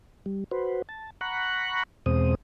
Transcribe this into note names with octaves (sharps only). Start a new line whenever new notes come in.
G3
F#4 B4 C5
A5
F#5 A#5 B5 C#6 F#6
E2 B2 G#3 C4 C5 D#6